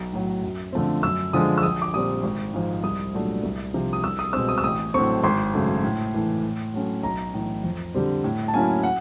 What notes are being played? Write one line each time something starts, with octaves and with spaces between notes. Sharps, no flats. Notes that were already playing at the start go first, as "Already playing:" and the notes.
Already playing: B1
A2 F#3
F#2
D3 F3 A3 C4
F#2 E6
D3 F3 G#3 D#6
E6
A#1 D#6
D6
A#2 G3 C4 D#6
G#1
G#2 F3
C2 D#6
A#2 F#3 A3 D4
C2
C3 F3
D#6
C2 E6
D#6
B2 G#3 C4 E6
D#6
E6
A1 D#6
A2 F#3 A3 C4 C#6
G#1 C6
F#2 C#3 F#3 A3
A2
E3 A3
A2
F#3 A3 C#4
B1 A#5
A2 E3
F2
D3 G3 C4
A2
A5
F#3 A#3 C#4 E4 G#5
F#5